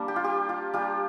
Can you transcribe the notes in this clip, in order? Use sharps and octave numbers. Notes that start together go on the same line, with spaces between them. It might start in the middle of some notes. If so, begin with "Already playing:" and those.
Already playing: G3 A#3 D4
G4
F4
G4
F4
G3 D4 F4 G4